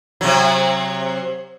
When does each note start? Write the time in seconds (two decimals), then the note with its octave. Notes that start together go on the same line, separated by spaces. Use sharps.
0.21 C3 F#3